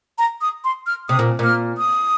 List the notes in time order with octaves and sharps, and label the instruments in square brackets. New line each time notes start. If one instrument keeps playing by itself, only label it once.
[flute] A#5
D#6
C6
F6
[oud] C3 [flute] D#6
[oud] A#2
[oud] A#2 [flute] F6
[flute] D#6